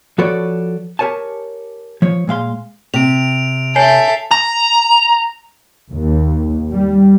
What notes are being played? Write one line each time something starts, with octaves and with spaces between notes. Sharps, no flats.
F3 F#4 A4 B4 C#5 D5
G4 A#4 C#5 G#5 A5
F3 C#5
A#2 G#3 F5 C6
C3 D7 F7
A4 C#5 E5 G#5 C7
A#5
D#2
G3